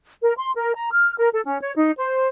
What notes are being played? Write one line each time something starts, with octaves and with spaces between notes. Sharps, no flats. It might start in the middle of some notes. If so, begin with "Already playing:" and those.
A#4
C6
A#4
A#5
F6
A#4
A4
C#4
C#5
D#4
C5